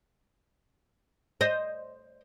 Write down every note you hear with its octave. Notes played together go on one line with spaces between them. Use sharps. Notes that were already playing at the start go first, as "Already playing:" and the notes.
C5 D#5